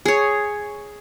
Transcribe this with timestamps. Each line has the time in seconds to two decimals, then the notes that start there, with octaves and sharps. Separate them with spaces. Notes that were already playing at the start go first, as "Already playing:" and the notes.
0.05 G#4 C#5